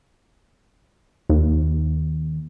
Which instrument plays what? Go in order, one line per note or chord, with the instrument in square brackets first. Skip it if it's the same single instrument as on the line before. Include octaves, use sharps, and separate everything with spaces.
[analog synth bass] D#2